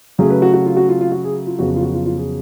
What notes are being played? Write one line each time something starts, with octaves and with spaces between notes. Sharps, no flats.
C#3 F#3 A3 C#4 G#4
B4
F#4
F#4
F4
F#4
F4
F4
F#4
G#4
F4
F2 C#3 F#3 B3 F#4
F4
F#4
F4
F4
G#4